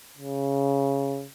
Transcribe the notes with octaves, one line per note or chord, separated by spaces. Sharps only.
C#3